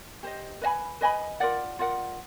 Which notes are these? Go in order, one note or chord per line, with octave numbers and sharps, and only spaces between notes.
G4 C5 D#5
B4 D#5 G#5 B5
B4 D#5 G#5 B5
F4 A#4 D5 F#5
F4 A#4 D5 F#5